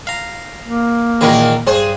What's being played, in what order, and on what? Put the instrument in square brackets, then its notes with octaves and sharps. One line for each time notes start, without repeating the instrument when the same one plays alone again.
[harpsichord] F5 A#5
[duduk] A#3
[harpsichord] A#2 D#3 G#4 [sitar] E3 A#4
[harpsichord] G2 [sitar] G#4 C5